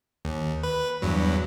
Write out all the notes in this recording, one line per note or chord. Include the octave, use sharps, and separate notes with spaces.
D#2
B4
E2 G2 F#3